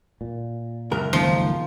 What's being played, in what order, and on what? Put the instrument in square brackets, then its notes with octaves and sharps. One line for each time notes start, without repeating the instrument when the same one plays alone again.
[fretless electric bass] A#2
[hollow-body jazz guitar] C#2 F#2 A#4
[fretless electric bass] B1 D#3 A#3 [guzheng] F3